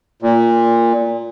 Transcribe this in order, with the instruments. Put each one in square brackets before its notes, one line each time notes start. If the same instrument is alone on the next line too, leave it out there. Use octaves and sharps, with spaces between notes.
[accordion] A#2